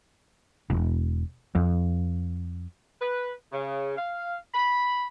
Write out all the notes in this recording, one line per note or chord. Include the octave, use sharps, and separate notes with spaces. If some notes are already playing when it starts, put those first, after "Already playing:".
E1
F2
B4
C#3
F5
B5